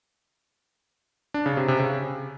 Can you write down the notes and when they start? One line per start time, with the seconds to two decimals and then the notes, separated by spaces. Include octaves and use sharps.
1.34 D4
1.46 C#3
1.57 C3
1.68 C3
1.80 C#3